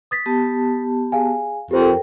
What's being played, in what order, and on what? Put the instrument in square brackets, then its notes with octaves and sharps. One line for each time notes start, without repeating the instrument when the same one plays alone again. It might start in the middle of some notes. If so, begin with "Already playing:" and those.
[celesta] D#6 A6 B6
[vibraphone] B3 G4 A5
[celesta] G#4 F5 G#5
[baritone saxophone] F2 [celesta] G4 C5 [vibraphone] A4 A#4 G5